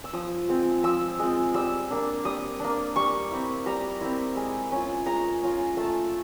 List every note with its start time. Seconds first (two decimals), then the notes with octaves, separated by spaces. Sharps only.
0.04 E6
0.13 F3 D#6
0.49 G#3 C4 F4
0.83 F3 E6
1.19 G#3 C4 F4
1.54 G3 E6
1.90 A#3 D4
2.25 G3 D#6
2.60 A#3 D4
2.96 G3 C#6
3.31 C4 E4
3.66 G3 A#5
4.01 C4 E4
4.36 G#3
4.72 C#4 F4
5.06 G#3 A#5
5.43 C#4 F4
5.77 A3 A5